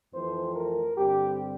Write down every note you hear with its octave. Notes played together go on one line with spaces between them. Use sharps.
F2 E3 A3 C4 C5
A#4
G2 D3 G3 C4 G4